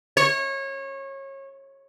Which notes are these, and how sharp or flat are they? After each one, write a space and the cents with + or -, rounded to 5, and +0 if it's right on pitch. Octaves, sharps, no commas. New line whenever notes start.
C#5 -25